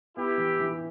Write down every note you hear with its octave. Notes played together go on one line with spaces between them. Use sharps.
B3 E4 G4
E3
E3